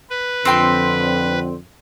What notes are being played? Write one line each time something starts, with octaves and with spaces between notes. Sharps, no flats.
B4
F2 D3 C4 G5 C6